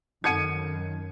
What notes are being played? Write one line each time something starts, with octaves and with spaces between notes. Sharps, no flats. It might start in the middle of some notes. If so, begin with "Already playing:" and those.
F#2 D#3 D#4 A4 F#5 G#6 C#7 D#7